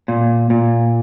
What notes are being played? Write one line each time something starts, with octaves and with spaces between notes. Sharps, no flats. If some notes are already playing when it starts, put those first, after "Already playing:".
A#2
A#2